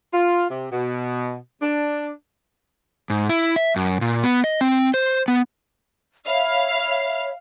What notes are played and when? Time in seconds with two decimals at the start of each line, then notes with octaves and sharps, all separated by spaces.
0.14 F4
0.51 C3
0.72 B2
1.62 D4
3.10 G#2
3.29 E4
3.56 E5
3.76 F#2
4.01 A#2
4.23 B3
4.44 D#5
4.61 C4
4.94 C5
5.28 B3
6.26 C#5 E5 F5 B5